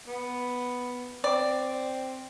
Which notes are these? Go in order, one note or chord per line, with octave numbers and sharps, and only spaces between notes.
B3
C4 D5